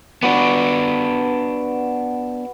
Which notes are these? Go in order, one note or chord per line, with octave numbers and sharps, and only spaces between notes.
B3 D4 F#4 B4 D6